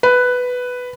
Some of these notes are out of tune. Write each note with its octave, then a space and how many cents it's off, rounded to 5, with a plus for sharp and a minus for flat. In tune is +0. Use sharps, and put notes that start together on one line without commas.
B4 +5